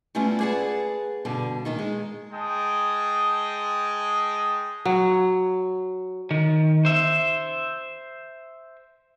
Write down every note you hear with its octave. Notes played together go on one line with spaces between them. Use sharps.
G3 A3 B3 C#4 E4 F4
G#4 B4 D5 F#5 G#5 A5
G2 B2 D3
A#2 D#3 D#4
G#3
G#3 G5 A5 D#6
F#3
D#3
C5 E5